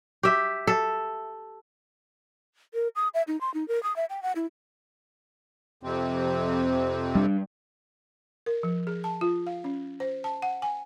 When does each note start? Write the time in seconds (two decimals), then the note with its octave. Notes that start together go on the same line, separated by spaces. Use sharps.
0.23 G4 E5
0.67 A4
2.74 A#4
2.96 D#6
3.14 E5
3.28 D#4
3.41 C6
3.54 D#4
3.68 A#4
3.83 D#6
3.96 E5
4.10 G5
4.23 F#5
4.36 E4
5.83 F2 C3 C4
7.15 G3 D4
8.46 A#4
8.63 F3
8.87 G#4
9.04 A5
9.21 F4
9.47 F5
9.64 C#4
10.00 C5
10.24 A5
10.42 F#5
10.62 G#5